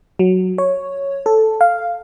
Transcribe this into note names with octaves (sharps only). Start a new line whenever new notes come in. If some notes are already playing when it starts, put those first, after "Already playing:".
F#3
C#5
A4
F5